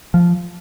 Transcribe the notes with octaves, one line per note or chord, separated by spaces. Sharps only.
F3